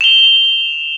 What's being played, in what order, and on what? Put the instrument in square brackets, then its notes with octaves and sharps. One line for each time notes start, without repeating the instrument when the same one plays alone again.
[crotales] E7 F7 G7